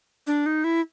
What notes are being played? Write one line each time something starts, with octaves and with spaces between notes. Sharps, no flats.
D4
D#4
E4